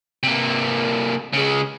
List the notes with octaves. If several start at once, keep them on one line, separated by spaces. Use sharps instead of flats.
C3 A#3
C#3 G#3